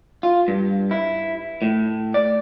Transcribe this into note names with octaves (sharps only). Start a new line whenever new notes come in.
F4
G2
E4
A2
D5